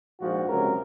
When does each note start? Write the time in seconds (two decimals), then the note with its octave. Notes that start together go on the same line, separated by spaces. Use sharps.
0.19 A#1 G#2 F3 F#4
0.48 C#2 C3 F#3 A#4